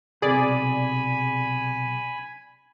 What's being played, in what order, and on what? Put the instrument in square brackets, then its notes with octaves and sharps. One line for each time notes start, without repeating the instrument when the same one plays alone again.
[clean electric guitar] B1 C3 [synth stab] G#4 D5 [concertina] G#5 B5